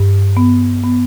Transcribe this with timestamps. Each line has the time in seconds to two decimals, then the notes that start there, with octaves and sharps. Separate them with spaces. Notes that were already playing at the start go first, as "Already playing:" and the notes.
Already playing: G2
0.37 B3
0.84 B3